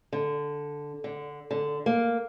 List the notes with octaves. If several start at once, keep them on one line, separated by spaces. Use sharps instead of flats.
D3
D3
D3
A#3